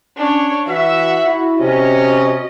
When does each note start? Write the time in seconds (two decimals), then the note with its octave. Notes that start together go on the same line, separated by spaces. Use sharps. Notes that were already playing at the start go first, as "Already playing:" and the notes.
0.17 C#4 D4 C#5
0.67 E3 F#4 E5 F#5
1.27 E4
1.60 C3 C#4 D#5